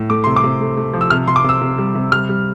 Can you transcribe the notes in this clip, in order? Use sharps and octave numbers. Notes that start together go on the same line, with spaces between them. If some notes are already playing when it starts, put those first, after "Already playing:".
Already playing: A2
A3 D6
C3 C6
D6
C3
A3
A3
F3
E6
C3 F6
C3 C6
D6
C3 E6
C3
G3
C3
G3 F6
G3